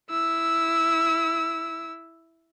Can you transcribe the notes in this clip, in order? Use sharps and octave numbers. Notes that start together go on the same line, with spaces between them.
E4 E6